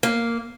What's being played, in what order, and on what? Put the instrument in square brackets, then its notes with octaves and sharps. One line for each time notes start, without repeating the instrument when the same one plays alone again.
[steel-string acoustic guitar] A#3